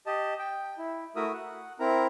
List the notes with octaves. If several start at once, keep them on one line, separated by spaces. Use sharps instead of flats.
G4 D#5 A5
G5
E4
A3 E4 F#4 A#4 E5 D#6
F#5
C4 E4 A#4 A#5